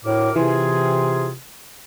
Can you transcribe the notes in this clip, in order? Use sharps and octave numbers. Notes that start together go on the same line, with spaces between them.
D2 A2 A#4 D6
C3 E3 C4 F4 G#4